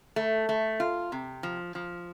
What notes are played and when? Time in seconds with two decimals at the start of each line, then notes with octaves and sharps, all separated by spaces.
0.16 A3
0.49 A3
0.80 F4
1.12 C3
1.43 F3
1.75 F3